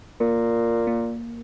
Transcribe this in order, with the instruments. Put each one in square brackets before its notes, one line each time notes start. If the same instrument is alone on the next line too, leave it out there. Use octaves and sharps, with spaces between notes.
[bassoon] A#2 [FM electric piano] A#3
[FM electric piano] A#3